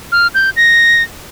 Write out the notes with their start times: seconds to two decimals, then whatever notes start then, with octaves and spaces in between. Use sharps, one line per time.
0.12 F6
0.35 G6
0.56 A#6